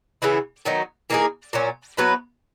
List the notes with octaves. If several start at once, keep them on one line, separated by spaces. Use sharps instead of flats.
C#3 E3 B3 E4
D#3 F#3 B3 D#4
E3 A#3 D#4 G#4
A#2 F#3 C#4
F#3 B3 E4 B4